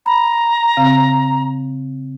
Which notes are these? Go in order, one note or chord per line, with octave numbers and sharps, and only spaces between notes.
A#5 B5
C#3 C4 F5